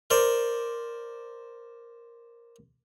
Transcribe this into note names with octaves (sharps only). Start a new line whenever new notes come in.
A#4 C5 D5